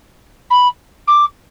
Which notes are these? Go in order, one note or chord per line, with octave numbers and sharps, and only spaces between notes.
B5
D6